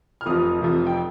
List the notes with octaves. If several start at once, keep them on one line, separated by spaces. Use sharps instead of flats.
F6
F1 F2 C3 F3 D#6
F1 F2 C3 F3
G5